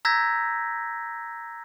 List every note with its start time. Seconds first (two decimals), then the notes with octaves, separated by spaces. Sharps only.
0.05 A#5 E6 G6 G#6 A#6 B6